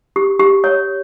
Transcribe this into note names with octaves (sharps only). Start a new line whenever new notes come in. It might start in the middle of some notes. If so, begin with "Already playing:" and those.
G4
G4
C#5